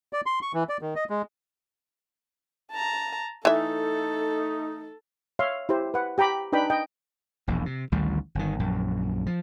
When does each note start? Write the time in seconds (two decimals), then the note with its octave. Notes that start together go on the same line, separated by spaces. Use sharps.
0.13 D5
0.26 C6
0.42 C#6
0.54 E3
0.69 D5
0.81 D#3
0.96 D#5
1.10 G#3
2.71 A5 A#5
3.45 E3 A3 D#4 A4 E5
5.39 C#5 E5 F5 C6
5.69 E4 G4 C5
5.94 B4 F#5
6.18 G4 G5 A#5 B5 D6
6.52 D4 D#4 B4 G5 B5
6.70 D#5 G5
7.47 E1 A#1 E2
7.66 C3
7.92 A1 D2 D#3 G3
8.35 G1 D#3
8.59 A#1 F#2
9.26 F3